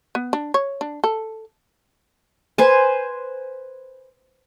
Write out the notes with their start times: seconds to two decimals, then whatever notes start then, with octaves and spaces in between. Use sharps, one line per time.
0.15 B3
0.33 D4
0.54 C#5
0.81 D4
1.04 A4
2.58 B4 C5 G#5